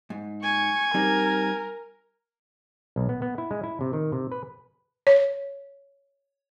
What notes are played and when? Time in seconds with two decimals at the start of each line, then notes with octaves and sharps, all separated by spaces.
0.10 G#2
0.43 G#5 C#6
0.94 G3 C4 D#4 A#4
2.96 B1
3.09 B3
3.22 B3
3.38 E4
3.51 G#3
3.63 E4
3.81 C3
3.93 D#3
4.12 C3
4.32 B4
5.07 C#5